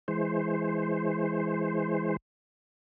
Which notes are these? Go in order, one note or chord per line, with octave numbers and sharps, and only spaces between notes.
E3 G#3 C5